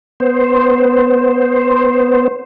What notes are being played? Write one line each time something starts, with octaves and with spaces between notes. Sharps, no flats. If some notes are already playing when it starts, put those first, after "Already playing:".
B3 C5